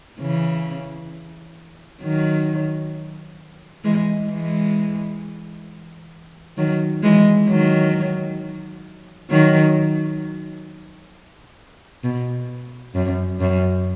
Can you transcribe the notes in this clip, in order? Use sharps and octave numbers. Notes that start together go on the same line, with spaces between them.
C#3 E3
D#3 F#3
E3 G#3
E3 G#3
D#3 F#3
E3 G#3
D#3 F#3
D#3 F#3
B2
F#2
F#2